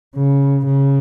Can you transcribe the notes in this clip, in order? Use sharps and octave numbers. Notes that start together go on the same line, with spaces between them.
C#3
C#3